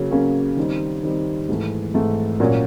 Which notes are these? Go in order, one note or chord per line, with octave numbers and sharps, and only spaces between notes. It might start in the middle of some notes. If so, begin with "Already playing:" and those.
Already playing: C#3 F#3 A#3 C#4
C#3 F#3 A#3 C#4
D#3 G3 C4 D#4
D#3 G3 C4 D#4
G#2 E3 A3
G#2 E3 A3
A#2 F#3 A#3 C#4 F#4